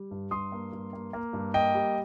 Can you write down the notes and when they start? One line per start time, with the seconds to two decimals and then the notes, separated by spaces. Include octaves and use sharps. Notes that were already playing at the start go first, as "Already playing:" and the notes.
Already playing: G3
0.11 G2
0.31 G2 C6 D#6
0.52 A#3
0.73 G2
0.93 A#3
1.13 A#3
1.33 G2
1.54 A#3 D#5 G5
1.75 G3